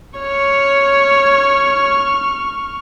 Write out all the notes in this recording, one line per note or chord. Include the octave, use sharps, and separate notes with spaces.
C#5 C#6 F6